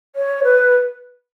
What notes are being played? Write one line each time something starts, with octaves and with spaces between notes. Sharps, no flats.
C#5
B4